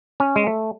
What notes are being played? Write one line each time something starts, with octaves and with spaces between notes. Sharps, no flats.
C#4
G#3
A3